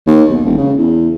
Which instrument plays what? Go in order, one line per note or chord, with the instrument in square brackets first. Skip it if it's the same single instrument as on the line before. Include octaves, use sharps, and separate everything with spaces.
[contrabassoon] D#2
B1
E1
C#3
E2